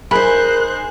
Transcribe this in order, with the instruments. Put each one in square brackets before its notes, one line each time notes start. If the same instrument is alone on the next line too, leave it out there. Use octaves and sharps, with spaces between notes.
[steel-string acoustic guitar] D#4 G#4 [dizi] A#4 [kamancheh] C5 F#6 [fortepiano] B5